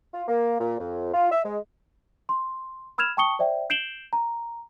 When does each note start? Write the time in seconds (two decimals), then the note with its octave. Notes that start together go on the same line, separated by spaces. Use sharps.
0.13 F4
0.28 A#3
0.60 A#2
0.79 F2
1.13 F4
1.32 E5
1.44 G#3
2.29 C6
2.98 B5 E6 F6 G#6 E7 F7
3.17 G5 A5 C#6 D#6 C#7 G7
3.39 C5 D5 E5 G5
3.70 G6 C7 D7 E7 F#7 G7
4.13 A#5